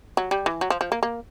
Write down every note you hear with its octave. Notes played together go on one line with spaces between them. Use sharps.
F#3
G3
E3
F#3
F3
F3
A#3
A#3